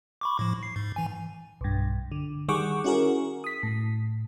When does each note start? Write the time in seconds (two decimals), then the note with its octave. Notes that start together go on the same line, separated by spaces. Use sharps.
0.21 B5 C#6 D6
0.39 A2 F3
0.63 C7
0.76 G#2
0.96 E3 G#5
1.61 B1 G2
2.12 D3
2.48 D#3 G3 G#4 F#5 C#6 D6
2.84 C#4 E4 F#4 G#4 A#4
3.44 D#6 B6
3.63 A2